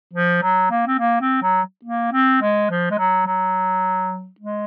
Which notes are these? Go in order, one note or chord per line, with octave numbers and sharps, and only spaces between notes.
F3
F#3
A#3
C4
A#3
C4
F#3
A#3
C4
G#3
F3
G#3
F#3
F#3
G#3